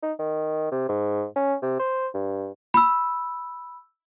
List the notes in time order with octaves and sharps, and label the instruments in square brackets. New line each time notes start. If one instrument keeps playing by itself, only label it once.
[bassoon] D#4
D#3
C3
G#2
C#4
C3
C5
G2
[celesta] B5 E6